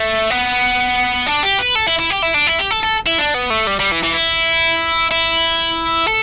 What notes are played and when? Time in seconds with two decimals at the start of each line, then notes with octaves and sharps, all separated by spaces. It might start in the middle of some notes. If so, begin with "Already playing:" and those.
Already playing: A3
0.30 B3
1.27 D4
1.43 G4
1.59 B4
1.75 A4
1.87 E4
1.99 E4
2.10 G4
2.23 E4
2.34 D4
2.47 E4
2.59 G4
2.71 A4
2.83 A4
3.07 E4
3.19 D4
3.35 B3
3.50 A3
3.67 G3
3.80 G3
3.91 E3
4.03 E3
4.14 E4
5.11 E4
6.07 A4